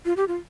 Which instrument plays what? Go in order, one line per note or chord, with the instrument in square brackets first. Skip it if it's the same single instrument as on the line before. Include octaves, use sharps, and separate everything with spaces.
[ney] F4
G4
F4